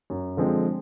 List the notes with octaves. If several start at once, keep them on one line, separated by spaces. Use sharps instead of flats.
F#2
D3 F3 G#3 C4